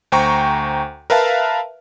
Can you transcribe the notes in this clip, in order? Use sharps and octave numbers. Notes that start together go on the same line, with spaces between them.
D2 C5 G5 A#5 C#6
A#4 B4 E5 F5 A5